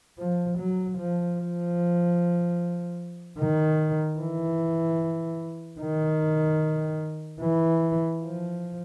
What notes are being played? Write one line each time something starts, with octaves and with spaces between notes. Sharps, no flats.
F3
F#3
F3
F3
D#3
E3
D#3
E3
F3